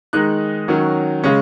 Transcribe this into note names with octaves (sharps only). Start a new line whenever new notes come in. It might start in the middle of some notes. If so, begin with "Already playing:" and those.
D#3 G#3 D#4 F#6
D#3 F#3 C#4
C#3 G#3 C#4